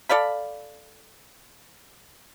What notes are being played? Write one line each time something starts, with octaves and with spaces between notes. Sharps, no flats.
A4 D5 F5 B5